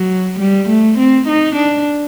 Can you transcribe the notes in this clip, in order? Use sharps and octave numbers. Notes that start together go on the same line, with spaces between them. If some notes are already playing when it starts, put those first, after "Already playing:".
Already playing: F#3
G3
A3
C4
D#4
D4